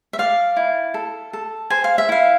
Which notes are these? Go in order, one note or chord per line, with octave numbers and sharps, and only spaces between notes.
E5
D5 F5
E4
A4
A4
C5 G#5
F5
E5
E4 F5